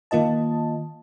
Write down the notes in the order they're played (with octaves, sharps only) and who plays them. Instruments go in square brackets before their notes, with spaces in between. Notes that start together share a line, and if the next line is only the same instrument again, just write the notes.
[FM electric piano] D#3 A#3 F4 D#5 A5